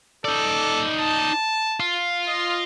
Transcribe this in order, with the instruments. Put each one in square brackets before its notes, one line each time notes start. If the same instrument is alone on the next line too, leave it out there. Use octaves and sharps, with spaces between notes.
[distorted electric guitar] D#4 D5 [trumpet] A4
[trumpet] A5
[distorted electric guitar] F4
[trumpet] D#5